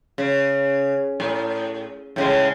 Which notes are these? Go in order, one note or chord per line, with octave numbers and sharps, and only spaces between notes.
C#3
A2
A2 C#3 G#3